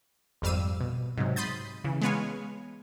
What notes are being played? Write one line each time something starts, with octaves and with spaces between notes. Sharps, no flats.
G#1 F2 G3 F5 E6 D#7
B2
G#2 C3 F#3
B5 C6 D#6 G6 A6
C#3 E3
G#3 B3 B4 C#5 F5 G#5